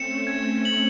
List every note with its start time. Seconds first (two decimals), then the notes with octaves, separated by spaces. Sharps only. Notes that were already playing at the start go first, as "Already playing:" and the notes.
Already playing: A3 C4 C#4 C#7 E7
0.27 C4 G#6
0.65 F#7